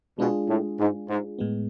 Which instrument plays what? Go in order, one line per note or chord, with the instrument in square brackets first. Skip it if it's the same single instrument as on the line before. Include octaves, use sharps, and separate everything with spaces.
[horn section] B2 [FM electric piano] G#3 D4 F4 G#4
[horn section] A2
G#2
G#2
[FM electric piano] A2 G#3 B3